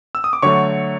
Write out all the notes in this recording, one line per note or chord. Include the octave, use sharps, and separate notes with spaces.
E6
D#6
D6
D3 F#3 A3 C#5 C#6